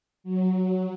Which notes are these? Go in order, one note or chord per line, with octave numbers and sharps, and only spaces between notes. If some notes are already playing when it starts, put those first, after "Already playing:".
F#3